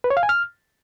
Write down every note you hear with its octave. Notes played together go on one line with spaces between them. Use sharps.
B4
C#5
F5
G#5
F6